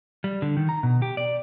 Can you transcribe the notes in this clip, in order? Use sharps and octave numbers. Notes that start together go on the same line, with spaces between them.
G3
D3
D#3
A#5
B2
G4
D5